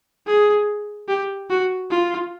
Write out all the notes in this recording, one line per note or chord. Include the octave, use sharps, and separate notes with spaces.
G#4
G4
F#4
F4